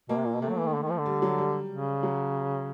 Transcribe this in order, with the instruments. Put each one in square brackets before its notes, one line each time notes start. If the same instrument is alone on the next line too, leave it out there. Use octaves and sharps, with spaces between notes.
[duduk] B2 [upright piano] A#3
[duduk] C3
A#2
B2
[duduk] C3 [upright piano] A3
[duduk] F#3
E3
D#3
D3
D#3
F3
D3
[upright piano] G3
F#3
G3
[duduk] C#3
[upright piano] F#3